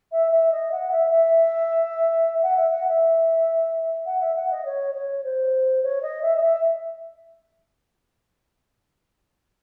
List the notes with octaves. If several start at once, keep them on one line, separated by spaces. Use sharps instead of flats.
E5
E5
D#5
F#5
E5
E5
F#5
E5
F#5
E5
F#5
E5
F#5
D#5
C#5
C#5
C5
C#5
D#5
E5
D#5
E5